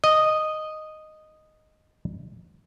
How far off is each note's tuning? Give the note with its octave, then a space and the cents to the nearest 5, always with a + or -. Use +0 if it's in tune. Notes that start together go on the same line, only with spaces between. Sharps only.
D#5 -5